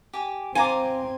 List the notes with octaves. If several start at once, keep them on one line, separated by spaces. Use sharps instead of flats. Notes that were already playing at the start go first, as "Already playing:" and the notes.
G4 G#5 D6
C4 F4 G#5 A#5 D6